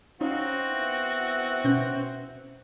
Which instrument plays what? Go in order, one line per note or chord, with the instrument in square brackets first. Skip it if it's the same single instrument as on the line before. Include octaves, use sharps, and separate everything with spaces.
[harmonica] C4 F#4 [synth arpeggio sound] C#4 D#4 [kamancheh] F5
[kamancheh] B3 E4
[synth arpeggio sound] B2 C#4 G6